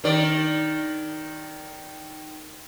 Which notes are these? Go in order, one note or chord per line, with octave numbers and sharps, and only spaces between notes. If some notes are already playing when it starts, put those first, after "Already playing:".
D#3 D5